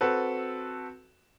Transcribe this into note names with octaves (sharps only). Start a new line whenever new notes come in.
C4 F#4 A4 B4